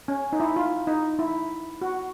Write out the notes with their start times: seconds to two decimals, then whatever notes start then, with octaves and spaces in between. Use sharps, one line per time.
0.08 C#4
0.33 D#4
0.40 E4
0.56 F4
0.87 D#4
1.19 E4
1.82 F#4